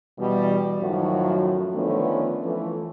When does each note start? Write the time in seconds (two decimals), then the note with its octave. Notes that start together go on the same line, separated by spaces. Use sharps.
0.19 B2 E3 G3
0.80 F#2 A2 D#3 F3 F#3 F#4
1.75 D3 D#3 F3 A3 B3 C#4
2.43 E3 F3 A3